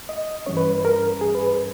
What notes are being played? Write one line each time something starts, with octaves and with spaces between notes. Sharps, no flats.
D#5
G2 E3 G3 C#4 C#5
B4
B4
A#4
G#4
B4
B4